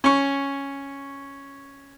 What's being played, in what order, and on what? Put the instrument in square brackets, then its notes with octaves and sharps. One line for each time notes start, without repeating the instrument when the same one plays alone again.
[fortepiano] C#4 C#6